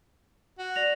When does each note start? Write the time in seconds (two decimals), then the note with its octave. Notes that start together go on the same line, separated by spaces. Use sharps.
0.59 F#4
0.76 D5 A#6 F7